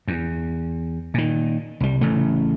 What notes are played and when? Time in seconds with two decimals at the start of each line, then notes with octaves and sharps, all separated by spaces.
0.08 E2
1.14 A#2 D#3
1.80 C2 G3
2.01 A1 C#3 A3